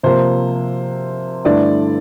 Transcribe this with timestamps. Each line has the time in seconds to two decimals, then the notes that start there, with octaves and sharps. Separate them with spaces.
0.03 C3 F3 A#3 C5
1.45 G2 D3 A3 E4 D5